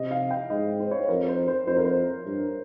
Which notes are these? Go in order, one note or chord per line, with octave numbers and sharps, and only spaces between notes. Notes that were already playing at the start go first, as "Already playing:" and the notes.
Already playing: C3 D#5
F5
G5
G#2 D#5
C5
C#5
C5
F2 A#4
C5
C5
F2 C5
A#4
C5
G2